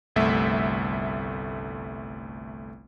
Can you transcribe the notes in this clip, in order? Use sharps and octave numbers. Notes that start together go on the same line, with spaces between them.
G1 C2 A3 E5